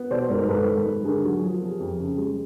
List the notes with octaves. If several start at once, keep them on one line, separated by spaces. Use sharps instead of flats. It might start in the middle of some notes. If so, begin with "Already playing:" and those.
Already playing: B3
B2 C5 D5
G#2 A#4 C5
A#4
G#2 A4 B4
D#3
G#2
D3 G#4 A#4
F#3
F3
C3
F2
C#3
G#3